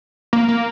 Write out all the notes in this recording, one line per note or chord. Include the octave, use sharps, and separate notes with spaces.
A#3
A#3